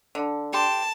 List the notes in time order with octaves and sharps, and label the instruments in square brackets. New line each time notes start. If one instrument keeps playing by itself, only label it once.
[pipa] D3
[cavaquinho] G4 C6 [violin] A5